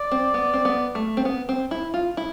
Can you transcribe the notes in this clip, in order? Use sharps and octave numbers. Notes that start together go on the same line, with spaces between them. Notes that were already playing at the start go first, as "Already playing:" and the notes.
Already playing: D5
C4
B3
C4
B3
A3
C4
B3
C4
E4
F4
E4